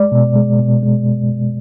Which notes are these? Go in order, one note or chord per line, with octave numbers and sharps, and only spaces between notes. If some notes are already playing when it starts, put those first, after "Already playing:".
Already playing: G#3 D5
B2
G#3
B2
G#3